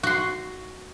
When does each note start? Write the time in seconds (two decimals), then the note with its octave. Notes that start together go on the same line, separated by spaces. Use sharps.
0.03 F#4 C6